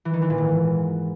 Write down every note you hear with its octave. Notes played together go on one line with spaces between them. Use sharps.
E3
D#3
E3
A#2
G#2